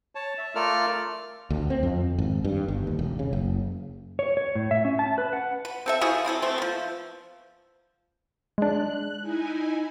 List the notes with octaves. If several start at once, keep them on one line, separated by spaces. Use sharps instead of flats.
C#5 A5
E5
A3 F4 A4 A#4 D5 F6
D2
C4
F2
G#1
G2
G1
D#2
E1
C#3
F#1
C#5
C#5
A2
E5
C#4
A5
B4
F#5
B4
C4 A4 E5
F3 E4 F#4 G#4
C4 E4 G#4 A4
A3 C4
F3 B3
G#3 D4 F#6
D#4 E4 G#5